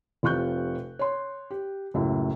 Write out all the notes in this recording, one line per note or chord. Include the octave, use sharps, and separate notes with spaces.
F1 C3 F4 C#6 F#6 G6
C#5 C6
G4
C#2 F#2 A2